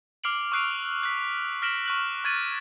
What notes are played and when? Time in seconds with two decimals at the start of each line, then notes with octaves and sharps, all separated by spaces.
0.24 D6 F6 C7 D7 F#7
0.52 C#6 E6 F#6 C7 D7 F7
1.03 F#6 B6
1.62 F6 A#6 B6 D7 E7 F#7
1.86 C#6 F#6 F#7
2.24 C#6 G#6 A6 D#7 F#7